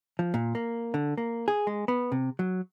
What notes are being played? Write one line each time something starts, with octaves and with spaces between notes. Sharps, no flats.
F3
A#2
A#3
D3
A#3
G#4
G#3
B3
C3
F#3